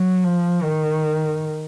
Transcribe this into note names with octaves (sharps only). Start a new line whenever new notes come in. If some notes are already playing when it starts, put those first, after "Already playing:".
Already playing: F#3
F3
D#3